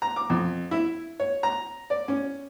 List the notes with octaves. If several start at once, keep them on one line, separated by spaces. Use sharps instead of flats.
A#5
D6
F2
E4
C#5
A#5
D5
C#4